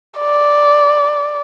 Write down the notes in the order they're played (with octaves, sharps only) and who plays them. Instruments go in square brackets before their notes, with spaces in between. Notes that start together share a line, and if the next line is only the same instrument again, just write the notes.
[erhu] D5